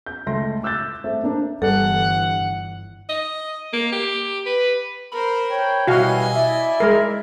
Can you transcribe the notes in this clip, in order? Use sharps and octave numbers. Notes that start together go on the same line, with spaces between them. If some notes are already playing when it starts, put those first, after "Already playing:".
G6
C#2 A3 C6 A#6
D6 E6 F#6 G6 A6
A3 C4 E5
A#3 D4
G1 G2 E3 D4 A4 F#5 G#5
D#5
A#3
G4
B4
A#4 C5 B5
C#5 G5
B2 E3 G3 E4 F#4 D#5 F5 G#5
E4 D5 E5
G#3 A#4